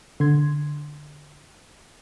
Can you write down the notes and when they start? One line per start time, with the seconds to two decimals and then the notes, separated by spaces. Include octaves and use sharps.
0.20 D3 C6 G#6